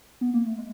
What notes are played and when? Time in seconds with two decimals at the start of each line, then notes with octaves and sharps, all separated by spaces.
0.21 B3
0.34 A#3
0.46 A3
0.58 G#3